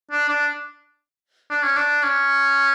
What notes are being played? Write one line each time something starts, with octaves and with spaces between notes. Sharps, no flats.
D4
D4
D4
C#4
D4
C#4